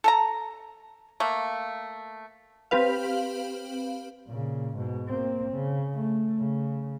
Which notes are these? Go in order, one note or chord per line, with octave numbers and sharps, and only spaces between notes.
A4 A5 A#5
A3 A#3
C4 G4 B4 F5
A#2 C#3
G#2 B2
A#3 C4
C#3
A3
C#3